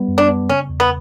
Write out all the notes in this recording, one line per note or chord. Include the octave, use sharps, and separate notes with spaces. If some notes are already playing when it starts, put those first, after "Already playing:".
Already playing: G3 B3
F#2
D4
B3
C#3 C#4
E2
B3